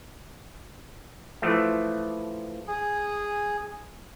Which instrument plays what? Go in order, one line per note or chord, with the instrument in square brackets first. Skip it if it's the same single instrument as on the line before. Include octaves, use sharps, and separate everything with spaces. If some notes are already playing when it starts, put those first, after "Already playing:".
[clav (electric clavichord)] E3 F3 A3
[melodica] G#4